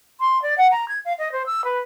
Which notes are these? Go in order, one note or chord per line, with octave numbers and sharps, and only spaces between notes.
C6
D5
F#5
A#5
G#6
F5
D#5
C5
E6
B4